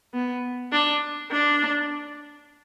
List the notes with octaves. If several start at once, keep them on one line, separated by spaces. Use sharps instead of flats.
B3
D4
D4